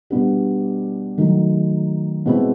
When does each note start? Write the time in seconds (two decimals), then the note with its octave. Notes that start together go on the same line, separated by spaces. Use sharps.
0.10 B2 G3 B3 D4 G4
1.18 D#3 F#3 A3
2.26 B2 G#3 C4 E4